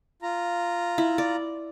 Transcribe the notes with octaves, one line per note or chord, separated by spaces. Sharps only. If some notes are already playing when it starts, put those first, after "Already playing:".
F4 A#5
E4
D5